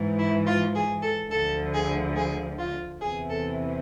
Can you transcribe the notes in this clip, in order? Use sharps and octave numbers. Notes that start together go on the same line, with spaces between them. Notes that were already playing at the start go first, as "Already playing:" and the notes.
Already playing: G#2 E3
E4
F4
G#4
A4
D2 D3 F3 A4
G#4
G#4
F4
E2 C3 E3 G#4
A4